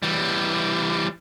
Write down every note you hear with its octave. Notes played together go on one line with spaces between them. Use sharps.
E3 G3